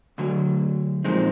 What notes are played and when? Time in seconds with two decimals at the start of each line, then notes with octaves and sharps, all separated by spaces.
0.18 D2 D3 F#3
1.04 A#2 F3 G#3 C4 D#4